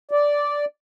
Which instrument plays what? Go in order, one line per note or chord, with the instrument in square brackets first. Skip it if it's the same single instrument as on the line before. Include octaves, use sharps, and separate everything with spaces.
[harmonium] D5